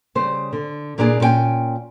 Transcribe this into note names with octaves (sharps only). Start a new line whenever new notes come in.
C#3 G3 C5
D3
A#2 A#3 B3 D4 E4 G#4
A#2 C#4 B4 G5 G#5